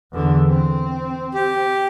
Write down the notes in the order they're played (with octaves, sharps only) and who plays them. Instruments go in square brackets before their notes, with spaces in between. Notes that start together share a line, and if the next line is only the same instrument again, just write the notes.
[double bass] E2 D3
C4
[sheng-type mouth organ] G4